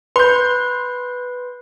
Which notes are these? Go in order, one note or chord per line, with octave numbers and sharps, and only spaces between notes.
B4 C6 G6